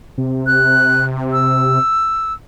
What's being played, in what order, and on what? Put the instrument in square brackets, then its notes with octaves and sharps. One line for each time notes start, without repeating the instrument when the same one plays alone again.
[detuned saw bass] C3
[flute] F#6
E6